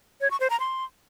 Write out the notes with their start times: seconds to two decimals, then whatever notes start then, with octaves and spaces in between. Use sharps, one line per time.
0.21 C#5
0.31 C#6
0.40 C5
0.50 A#5
0.60 C6